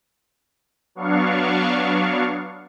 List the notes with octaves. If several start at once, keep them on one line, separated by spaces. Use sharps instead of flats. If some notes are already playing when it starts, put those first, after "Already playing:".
F#3 B3 D4 F5 C#6